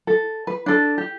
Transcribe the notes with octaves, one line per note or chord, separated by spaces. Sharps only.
A4
B4
D4 A4
G4